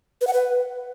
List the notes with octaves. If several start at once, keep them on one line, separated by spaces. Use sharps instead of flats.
B4
F#5
B4